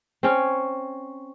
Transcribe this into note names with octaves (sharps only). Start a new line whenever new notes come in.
C4 C#4 C#5